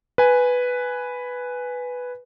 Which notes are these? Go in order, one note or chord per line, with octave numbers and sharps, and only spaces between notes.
B4 G#5